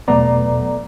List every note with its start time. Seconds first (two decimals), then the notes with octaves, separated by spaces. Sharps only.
0.08 E2 B2 F#3 A3 B3 D5 A#5